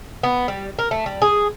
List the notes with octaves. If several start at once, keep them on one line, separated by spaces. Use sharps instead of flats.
B3
G3
A#4
A3
G3
G#4